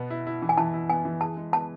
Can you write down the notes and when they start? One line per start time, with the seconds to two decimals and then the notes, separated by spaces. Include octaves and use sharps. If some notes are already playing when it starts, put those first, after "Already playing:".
Already playing: B2 B3
0.10 E4
0.27 E4
0.42 E3
0.49 G#5
0.57 E3 A5
0.74 E4
0.90 B3 G#5
1.05 E3
1.21 G#4 A5
1.37 G#3
1.53 B3 A5